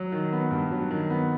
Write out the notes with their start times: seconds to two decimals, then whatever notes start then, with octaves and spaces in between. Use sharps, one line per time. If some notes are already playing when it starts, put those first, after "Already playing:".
Already playing: F#3
0.12 D#3
0.32 B3
0.51 G2
0.71 F#3
0.91 D#3
1.10 B3